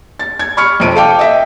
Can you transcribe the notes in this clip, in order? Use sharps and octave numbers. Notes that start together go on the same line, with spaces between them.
A6
G#6
B5 C#6 F6 C#7
F2 C3 D7 D#7
A4 F5 G5 D6
D#5 E5 G5